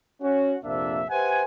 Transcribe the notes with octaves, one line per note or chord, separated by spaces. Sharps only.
C#4 F#4
A#1 F2 C3 A#3 D4 E5
G4 B4 C5 E5 F#5 G#5